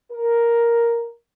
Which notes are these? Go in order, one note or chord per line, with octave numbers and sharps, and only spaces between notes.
A#4